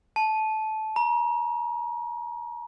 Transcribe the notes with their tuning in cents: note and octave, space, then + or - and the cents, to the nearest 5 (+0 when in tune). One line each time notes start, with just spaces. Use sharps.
A5 -20
A#5 +35